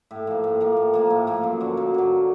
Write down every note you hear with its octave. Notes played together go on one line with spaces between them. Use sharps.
A2
F3 A#3
A2
F3 A#3
A2
F3 A#3
A2
F3 A#3
F#2
D3 F#3
F#2
D3 F#3